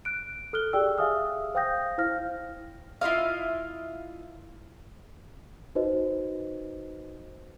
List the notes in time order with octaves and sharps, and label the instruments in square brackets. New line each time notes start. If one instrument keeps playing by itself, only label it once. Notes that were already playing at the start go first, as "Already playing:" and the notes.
[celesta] F#6 D7
A4 F6 F#6 G7
G4 G#4 D5 G5 E6
G#4 E5 F5 G#5 D#6 F6
C5 F5 G5 D#6 G6 A#6
E4 C5 F5 F6 A#6
[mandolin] E4 F4 D#5 F5
[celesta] D#4 F#4 B4 C5 D#5